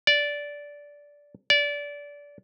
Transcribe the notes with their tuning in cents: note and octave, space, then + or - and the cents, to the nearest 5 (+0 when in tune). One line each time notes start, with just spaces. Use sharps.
D5 -15
D5 -25